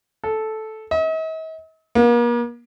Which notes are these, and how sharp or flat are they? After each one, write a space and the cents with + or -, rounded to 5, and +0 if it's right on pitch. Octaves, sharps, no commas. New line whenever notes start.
A4 -10
D#5 +45
A#3 +40